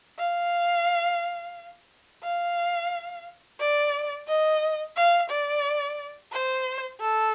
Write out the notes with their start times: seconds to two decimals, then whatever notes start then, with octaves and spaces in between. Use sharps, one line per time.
0.19 F5
2.23 F5
3.59 D5
4.28 D#5
4.96 F5
5.30 D5
6.32 C5
7.00 A4